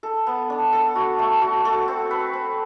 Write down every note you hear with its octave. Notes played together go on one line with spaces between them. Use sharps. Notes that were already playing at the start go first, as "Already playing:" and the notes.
A4
B3
D4
A4
F#4
A3
F#4
A4
C4
B4
C4